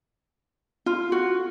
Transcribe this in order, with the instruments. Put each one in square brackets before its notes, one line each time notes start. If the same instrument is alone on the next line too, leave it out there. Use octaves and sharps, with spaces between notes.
[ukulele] F4
F#4